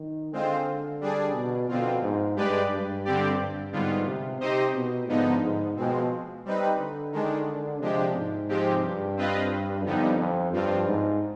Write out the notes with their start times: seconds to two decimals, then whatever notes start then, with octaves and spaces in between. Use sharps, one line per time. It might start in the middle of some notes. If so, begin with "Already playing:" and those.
Already playing: D#3
0.32 D3 G#3 C4 F4 C5
1.01 G3 D4 G#4 D5
1.35 B2
1.68 B2 D3 F3 C4 F4
2.02 G#2
2.36 G2 G#3 D4 G4 B4 D5
2.71 G2
3.05 D3 G3 C4 G4 D5
3.39 G2
3.72 G#2 D3 G3 B3 F4
4.07 C3
4.40 C3 C4 D#4 G4 C5 D#5
4.75 B2
5.09 G#2 D3 F3 B3 D#4
5.43 G#2
5.77 B2 F3 G#3 C4
6.45 G3 C4 D#4 B4
6.79 D3
7.12 D#3 G#3 D4
7.81 C3 F3 G#3 D4 G4
8.15 G#2
8.49 C3 F3 G#3 C4 G4
8.83 G2
9.17 C4 F4 B4 D#5
9.85 F2 D3 G3 B3 D#4
10.19 F2
10.53 G2 F3 C4 F4
10.87 G#2